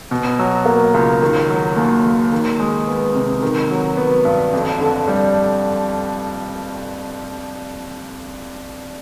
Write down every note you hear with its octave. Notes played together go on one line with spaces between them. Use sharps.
B2
F#3
A#3
C#2
D#3
F#3
D#2
D#2
D#3
G#3
B3
C3
D#3
F#3
B3
G2
F2
D3
G3